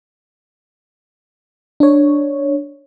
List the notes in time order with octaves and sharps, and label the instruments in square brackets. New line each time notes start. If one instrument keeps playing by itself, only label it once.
[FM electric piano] D4 C#5